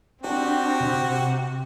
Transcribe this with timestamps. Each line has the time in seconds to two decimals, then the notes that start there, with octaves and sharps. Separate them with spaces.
0.24 C4 D4 F#4 G4
0.80 C3